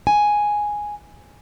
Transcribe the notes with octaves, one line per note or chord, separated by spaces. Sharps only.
G#5